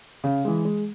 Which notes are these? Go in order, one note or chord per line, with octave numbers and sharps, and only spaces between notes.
C#3
E3 G#3
G#3